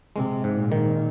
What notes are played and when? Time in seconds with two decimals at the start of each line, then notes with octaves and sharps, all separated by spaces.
0.16 C3 G#3
0.44 G#2
0.58 A#2
0.72 D#3